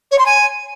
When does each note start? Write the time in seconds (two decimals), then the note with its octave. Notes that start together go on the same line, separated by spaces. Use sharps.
0.11 C#5
0.18 C6
0.25 G#5